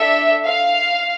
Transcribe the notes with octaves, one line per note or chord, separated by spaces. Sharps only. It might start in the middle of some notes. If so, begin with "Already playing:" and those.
Already playing: D4 A4 E5
F5